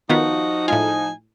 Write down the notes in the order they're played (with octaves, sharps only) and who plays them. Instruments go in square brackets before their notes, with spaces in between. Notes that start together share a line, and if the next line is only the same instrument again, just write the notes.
[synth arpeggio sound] D#3 B3 F4 [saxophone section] F3 D#4 [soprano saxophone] F#4
[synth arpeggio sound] A2 G#3 F4 [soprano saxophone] G#5